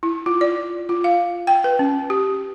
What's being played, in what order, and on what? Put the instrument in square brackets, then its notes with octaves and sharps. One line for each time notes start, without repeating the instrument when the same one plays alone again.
[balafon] E4
F4
D5
F4
F5
G5
B4
C#4
G4